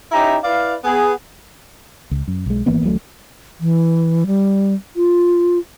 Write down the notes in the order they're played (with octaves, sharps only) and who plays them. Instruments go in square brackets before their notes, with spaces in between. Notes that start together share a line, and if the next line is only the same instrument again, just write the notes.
[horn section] C#4 D#4 E4 G4 E5 A#5
E4 B4 D5 F5
B3 G#4
[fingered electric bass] C#2
F#2
B1 G#3
G#1 E3 A#3 B3
D1 A1 F#3 A3
[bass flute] E3
G3
F4